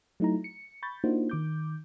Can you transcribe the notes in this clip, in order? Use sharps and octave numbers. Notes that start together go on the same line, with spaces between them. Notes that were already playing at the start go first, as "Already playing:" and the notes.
F#3 A3 D#4 E4 A#5
C#7
B5 C#6 G6 A6
A#3 D4 D#4 F4 F#4 C5
D#3 D6 G6